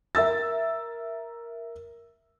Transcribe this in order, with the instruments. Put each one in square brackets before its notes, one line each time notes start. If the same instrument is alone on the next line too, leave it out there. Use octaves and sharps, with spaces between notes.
[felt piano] A#4 E5 E6 A6